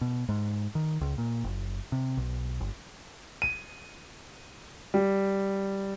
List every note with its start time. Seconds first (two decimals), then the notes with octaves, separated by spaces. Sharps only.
0.01 B2
0.29 G#2
0.75 D#3
1.01 C#2
1.18 A#2
1.44 F#1
1.92 C3
2.17 B1
2.60 G1
3.42 D#7
4.94 G3